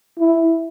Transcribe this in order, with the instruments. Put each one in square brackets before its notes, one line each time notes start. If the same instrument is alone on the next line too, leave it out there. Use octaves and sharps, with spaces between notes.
[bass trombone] E4